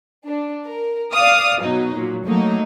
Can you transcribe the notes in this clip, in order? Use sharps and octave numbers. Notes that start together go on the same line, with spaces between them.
D4
A#4
D5 F5 D#6
B2 F#3 D#4
A#2 F#3
F#3 A3 A#3 D#4